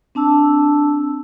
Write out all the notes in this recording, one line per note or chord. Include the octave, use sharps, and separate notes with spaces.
C4 D4 A5 E6